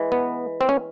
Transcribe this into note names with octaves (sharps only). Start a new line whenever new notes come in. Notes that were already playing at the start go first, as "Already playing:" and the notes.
Already playing: E3 G#3
B3
C4
C#4